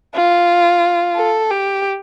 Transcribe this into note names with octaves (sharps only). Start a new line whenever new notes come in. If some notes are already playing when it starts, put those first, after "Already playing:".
F4
A4
G4